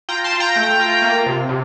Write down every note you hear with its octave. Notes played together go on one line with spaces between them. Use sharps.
F4 G5 A#5
A5 C6
F4
G5 A#5
A3
F4
A#3
C3
C3